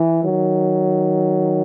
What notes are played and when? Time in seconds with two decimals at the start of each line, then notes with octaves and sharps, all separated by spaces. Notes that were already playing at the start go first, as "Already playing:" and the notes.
Already playing: E3
0.23 D#3 F#3